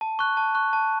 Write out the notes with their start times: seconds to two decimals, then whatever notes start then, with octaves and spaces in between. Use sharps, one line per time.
0.01 A5
0.19 C#6 F#6
0.37 A5
0.55 C#6 F#6
0.73 A5